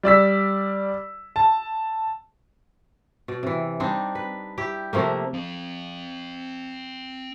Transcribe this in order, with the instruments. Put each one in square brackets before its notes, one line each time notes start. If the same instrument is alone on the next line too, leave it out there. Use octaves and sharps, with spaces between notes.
[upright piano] G3 D5 E6 B6
A5
[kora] B2 D5
C3 E3
G3 C4 D4 D#4
B4
E4 G4
C3 F3 A3 A#3
[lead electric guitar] C4 F5